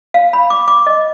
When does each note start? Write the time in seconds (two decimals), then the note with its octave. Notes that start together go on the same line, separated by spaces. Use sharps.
0.14 F5
0.33 B5
0.50 D6
0.68 D6
0.87 D#5